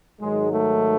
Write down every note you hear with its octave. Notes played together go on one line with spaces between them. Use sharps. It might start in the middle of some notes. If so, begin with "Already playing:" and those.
G#2 D#3 F#3 G#3
A3